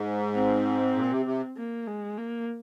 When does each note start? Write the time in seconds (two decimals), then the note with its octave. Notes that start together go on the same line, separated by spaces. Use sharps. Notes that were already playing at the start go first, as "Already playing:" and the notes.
Already playing: G#2
0.34 C4
0.96 A#2
1.11 C3
1.26 C3
1.57 A#3
1.87 G#3
2.18 A#3